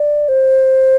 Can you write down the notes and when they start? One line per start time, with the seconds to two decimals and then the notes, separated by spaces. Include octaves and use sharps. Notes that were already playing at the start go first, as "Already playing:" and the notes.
Already playing: D5
0.28 C5